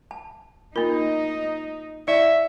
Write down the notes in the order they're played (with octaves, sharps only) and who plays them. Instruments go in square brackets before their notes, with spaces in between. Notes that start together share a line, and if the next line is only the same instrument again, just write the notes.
[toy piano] A5
[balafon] A#3 A#4 [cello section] D#4 [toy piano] F4
[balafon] E4 [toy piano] D5 [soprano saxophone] E5